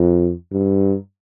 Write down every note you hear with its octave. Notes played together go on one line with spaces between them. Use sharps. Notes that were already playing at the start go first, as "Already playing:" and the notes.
Already playing: F2
G2